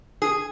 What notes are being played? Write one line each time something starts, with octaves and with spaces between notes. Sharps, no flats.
G#4